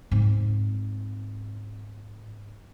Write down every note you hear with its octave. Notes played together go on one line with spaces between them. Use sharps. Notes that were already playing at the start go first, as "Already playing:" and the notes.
G#2 C4